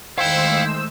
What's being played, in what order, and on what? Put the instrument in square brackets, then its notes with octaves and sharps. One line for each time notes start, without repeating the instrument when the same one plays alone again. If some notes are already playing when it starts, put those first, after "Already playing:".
[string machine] D#3 G#3 A3 [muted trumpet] E4 [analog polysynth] C5 E6 [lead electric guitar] F5 G5